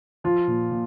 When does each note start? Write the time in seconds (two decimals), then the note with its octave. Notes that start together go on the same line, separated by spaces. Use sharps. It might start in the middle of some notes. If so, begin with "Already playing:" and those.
0.24 F3 F4
0.47 A#2
0.71 A#2